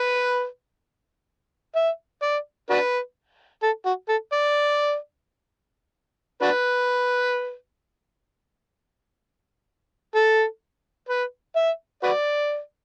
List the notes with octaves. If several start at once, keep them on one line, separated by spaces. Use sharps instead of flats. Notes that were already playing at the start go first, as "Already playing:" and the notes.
Already playing: B4
E5
D5
D4 F#4 B4
A4
F#4
A4
D5
D4 F#4 B4
A4
B4
E5
F#4 B4 D5